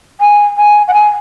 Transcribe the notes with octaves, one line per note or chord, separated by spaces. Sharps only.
G#5
G#5
F#5
G#5